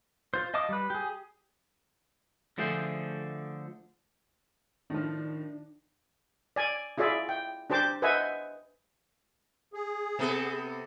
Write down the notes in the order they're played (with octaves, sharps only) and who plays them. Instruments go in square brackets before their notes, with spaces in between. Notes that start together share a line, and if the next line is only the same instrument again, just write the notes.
[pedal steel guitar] F4 C5
D#5 F5 A5 D6 D#6
G3 B4
G4 G#4
[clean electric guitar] D3 F3 A3 G#4 C5
[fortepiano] A2 F3 [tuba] D#3 [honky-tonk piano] D4
[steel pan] D5 G#5
E4 F4 G#4 D5 E5
G5
D4 G4 C5 A5 D6
B4 C5 D#5 E5 F#5 G#5
[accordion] G#4
[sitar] C3 B3 A4